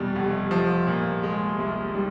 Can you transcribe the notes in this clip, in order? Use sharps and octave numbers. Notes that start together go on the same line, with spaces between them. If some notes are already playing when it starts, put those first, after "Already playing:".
Already playing: E2 B2 G3
F1
F3
A#2
G#3
C2
G3